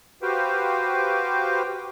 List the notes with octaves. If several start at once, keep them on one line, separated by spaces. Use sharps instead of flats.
F#4 G4 B4 C5 F5 G5